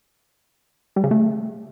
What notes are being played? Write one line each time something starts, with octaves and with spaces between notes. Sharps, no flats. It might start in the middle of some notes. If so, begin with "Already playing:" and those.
G3
C#3
A3